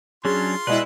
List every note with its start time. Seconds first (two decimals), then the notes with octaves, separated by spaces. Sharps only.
0.25 F#3 C#4 D4 F4 G#4 C6
0.67 B2 G#3 E4 B4 D5 D#5